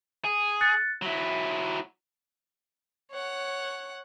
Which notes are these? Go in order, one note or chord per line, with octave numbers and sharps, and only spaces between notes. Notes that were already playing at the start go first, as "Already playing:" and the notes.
G#4
F#6 A6 C#7
F#3 E4 B5
C#5 F#5